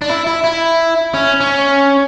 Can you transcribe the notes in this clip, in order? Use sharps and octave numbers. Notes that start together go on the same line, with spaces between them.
D4
E4
E4
E4
C#4
C#4